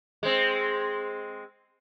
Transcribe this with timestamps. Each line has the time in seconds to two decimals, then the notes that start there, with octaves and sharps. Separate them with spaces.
0.23 G#3 C4